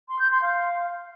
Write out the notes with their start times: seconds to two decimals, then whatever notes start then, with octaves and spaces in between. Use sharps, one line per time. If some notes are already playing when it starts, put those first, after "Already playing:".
0.08 C6
0.20 G6
0.31 C6
0.42 F5